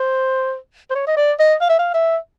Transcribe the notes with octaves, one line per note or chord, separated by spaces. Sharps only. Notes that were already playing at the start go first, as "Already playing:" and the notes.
Already playing: C5
C5
C#5
D#5
D5
D#5
F5
E5
F5
E5